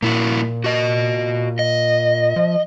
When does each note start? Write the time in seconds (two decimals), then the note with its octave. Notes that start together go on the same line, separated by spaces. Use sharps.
0.02 A#2 A#3 E4 F#4
0.64 F#4 D#5
1.59 D#5
2.36 F3